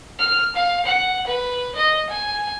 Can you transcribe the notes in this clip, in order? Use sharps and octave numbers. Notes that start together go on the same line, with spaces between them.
F6
F5
F#5
B4
D#5
G#5